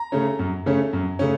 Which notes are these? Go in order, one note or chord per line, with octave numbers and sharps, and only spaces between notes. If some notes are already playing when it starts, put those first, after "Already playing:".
Already playing: A#5
C#3 A3 C#4
F#2
C#3 A3 C#4
F#2
C#3 A3 C#4